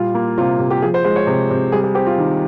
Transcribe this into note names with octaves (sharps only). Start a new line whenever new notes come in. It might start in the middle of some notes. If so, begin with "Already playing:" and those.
Already playing: A#2 G3 F4
A#3
C3 F4
C3
G4
F3 G#4
C5
G#3 C5
C#5
C3
C3
G3 G#4
G#4
C4 G4
F4
D#3